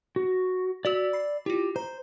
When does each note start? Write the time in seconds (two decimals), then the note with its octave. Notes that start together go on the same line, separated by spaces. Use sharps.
0.16 F#4
0.85 F#4 D5 E6 F#7
1.13 B5 C7
1.46 E4 F4 G4
1.76 C5 A#5